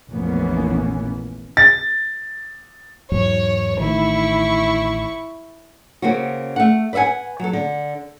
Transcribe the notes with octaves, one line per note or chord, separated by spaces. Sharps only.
F1 A#1 E3 A#3 B3 C#4
A6
E2 G#2 F#3 C#5
A1 D#3 A3 E4 C#6
C#3 A#3 C4 C#4 F#4
A3 F#5
B4 D5 E5 F#5 G#5
F#3 A4
D3